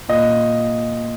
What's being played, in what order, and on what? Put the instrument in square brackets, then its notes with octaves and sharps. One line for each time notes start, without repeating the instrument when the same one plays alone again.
[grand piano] A#2 D#5